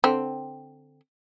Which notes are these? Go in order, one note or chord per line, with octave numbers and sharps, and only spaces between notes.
D3 C4